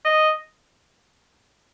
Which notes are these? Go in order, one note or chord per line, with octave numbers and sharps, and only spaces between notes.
D#5